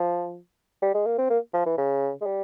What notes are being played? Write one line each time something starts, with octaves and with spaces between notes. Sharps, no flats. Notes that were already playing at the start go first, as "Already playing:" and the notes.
Already playing: F3
G3
G#3
A#3
C4
A#3
F3
E3
C#3
G#3
G3